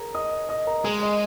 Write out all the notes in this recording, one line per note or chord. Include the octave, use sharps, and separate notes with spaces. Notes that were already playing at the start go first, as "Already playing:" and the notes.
Already playing: G#4 A#4 A#5
D#5 D#6
D#5 D#6
A#4 A#5
G#3 G#4 G#5
D#5